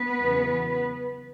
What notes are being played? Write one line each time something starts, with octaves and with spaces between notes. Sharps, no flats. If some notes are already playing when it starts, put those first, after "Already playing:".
Already playing: B3 B4
E2 C#3 F#3